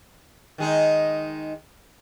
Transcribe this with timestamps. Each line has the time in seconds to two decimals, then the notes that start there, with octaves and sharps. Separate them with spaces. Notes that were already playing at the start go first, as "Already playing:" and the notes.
0.58 D#3 G#3 D#4